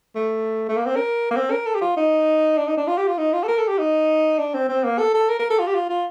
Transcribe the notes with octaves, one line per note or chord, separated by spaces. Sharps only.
A3
A3
A#3
C4
A#4
A#3
C4
A#4
A4
G4
F4
D#4
D4
D#4
D4
F4
G4
F4
D#4
F4
A4
A#4
A4
G4
D#4
D4
C4
C4
A#3
A4
A4
A#4
A#4
A4
F4
G4
F4
F4